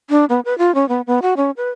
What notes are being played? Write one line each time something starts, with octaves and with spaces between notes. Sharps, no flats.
D4
B3
B4
F4
C#4
B3
B3
F#4
C#4
B4